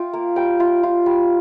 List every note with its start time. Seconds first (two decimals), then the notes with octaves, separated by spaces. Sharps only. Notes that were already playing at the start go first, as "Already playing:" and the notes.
Already playing: F4 G5
0.13 A#3
0.36 G3 G5
0.60 F4
0.83 F4
1.06 G3